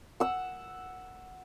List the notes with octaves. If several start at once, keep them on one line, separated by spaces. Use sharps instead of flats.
F#5 E6